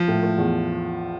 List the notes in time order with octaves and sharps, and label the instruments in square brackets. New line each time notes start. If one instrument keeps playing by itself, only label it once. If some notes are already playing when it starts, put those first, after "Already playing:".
Already playing: [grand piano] F3
[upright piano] A2
A3
E2